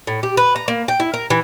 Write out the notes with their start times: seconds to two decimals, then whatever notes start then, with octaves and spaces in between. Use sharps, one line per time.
0.07 A2
0.23 G4
0.37 B4
0.56 A#5
0.68 A#3
0.88 G5
1.00 E4
1.14 A#4
1.30 E3